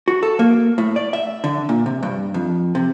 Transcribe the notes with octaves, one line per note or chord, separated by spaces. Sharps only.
F#4
A4
A#3
A2
D5
E5
D3
A#2
C3
G2
F2
C3